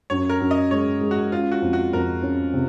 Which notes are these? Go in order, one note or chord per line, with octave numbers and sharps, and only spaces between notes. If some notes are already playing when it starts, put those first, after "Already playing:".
F#2 C#5
A#4
F#2
D#5
G#3 C#5
G#3
F#4
C#4 F4
F#4
F2
F#4
F2 A#4
C#4
C3